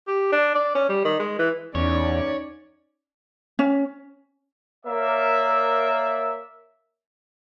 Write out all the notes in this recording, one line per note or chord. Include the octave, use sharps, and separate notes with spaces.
G4
D4
D5
C#4
G3
D#3
G#3
E3
E2 C#4 D#4 C#5 D5
C#4
A#3 A#4 C#5 D5 E5